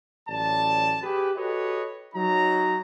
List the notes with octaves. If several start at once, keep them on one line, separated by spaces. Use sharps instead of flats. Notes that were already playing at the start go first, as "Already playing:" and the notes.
A1 F#3 D5 A5
G4 G#4 B4
F#4 G4 A4 B4 C#5 D#5
F#3 D#4 A#5